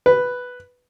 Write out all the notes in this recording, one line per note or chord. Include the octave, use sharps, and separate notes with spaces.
B4